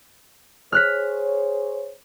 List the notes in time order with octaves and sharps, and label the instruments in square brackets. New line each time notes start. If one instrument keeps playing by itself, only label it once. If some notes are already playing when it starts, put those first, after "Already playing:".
[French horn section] G#4 C5 C#5 [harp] F6 F#6 B6